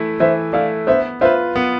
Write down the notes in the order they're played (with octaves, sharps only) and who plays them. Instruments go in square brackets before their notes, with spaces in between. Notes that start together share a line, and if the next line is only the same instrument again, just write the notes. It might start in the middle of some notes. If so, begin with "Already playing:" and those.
Already playing: [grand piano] E3 A3 E4
[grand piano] E3 [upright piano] C5 E5
[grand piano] A3 E4 [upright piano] D5 F5
[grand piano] B3 [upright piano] C5 E5
[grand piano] F4 B4 [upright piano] C5 E5
[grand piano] B3